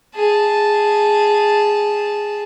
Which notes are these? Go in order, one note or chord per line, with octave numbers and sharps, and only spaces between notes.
G#4 A5